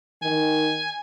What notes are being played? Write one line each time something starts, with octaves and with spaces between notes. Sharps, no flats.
D#3 G#5